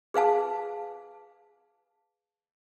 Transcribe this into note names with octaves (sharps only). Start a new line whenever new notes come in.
G#4 B4 F5 A5